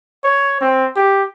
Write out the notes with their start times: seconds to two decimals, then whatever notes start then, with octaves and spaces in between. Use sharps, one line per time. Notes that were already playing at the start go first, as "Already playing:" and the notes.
0.24 C#5
0.61 C4
0.96 G4